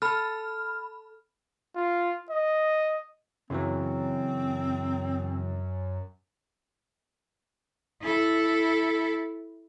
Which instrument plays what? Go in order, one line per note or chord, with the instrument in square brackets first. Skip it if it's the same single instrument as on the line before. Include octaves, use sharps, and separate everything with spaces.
[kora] A4 [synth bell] B5 F6
[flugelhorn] F4
D#5
[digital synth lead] F#2 [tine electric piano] C#3 E3 F#3 [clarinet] C4
[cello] E4 A4